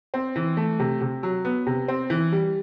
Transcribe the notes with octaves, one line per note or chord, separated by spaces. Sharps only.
C4
E3
A3
C3
C3
F#3
B3
C3
C4
E3
G3